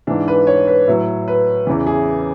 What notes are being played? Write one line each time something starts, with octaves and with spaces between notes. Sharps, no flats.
G#2 E3 D4
B4
C#5
B4
A2 F#3
B4
E2 C#3 E3
G#4